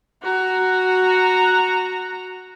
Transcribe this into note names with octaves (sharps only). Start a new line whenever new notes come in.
F#4 A#5